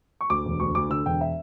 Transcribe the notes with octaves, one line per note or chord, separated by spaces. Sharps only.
C#6
D2 D6
E1
D2 C#6
D2 D6
D3 E6
E1 G5
E5